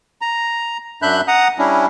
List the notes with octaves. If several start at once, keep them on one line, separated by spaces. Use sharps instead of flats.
A#5
F#2 D4 E5 B5 F#6 G6
F#5 A#5 D#6
G3 C#4 D4 E4